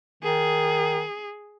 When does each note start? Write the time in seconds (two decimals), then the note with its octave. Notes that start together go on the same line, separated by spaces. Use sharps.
0.23 D#3 G#4